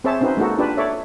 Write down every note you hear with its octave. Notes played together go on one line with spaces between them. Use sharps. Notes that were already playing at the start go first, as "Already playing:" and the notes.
C4 G#4 C5 C#5 E5 A5
C4 C#4 D#4 F#4 B4 C5
G#3 A#3 D#4 F#4 A4
D4 F4 G4 B4 D5 A5
A4 C#5 D5 E5